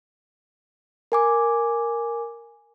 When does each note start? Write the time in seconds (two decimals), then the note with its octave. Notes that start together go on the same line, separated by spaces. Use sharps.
1.12 A#4 G#5 D6